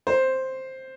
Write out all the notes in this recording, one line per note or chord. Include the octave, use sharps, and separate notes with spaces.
C5